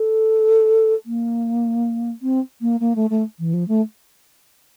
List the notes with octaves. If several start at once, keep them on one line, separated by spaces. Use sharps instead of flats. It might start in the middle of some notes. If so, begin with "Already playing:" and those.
Already playing: A4
A#3
C4
A#3
A#3
A3
A3
E3
F3
A3